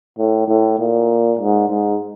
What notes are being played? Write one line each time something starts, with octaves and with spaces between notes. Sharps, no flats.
A2
A2
A#2
G#2
G#2